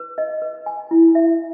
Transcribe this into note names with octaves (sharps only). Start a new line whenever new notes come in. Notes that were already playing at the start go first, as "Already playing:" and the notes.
Already playing: B4
D#5
B4
G#5
E4
E5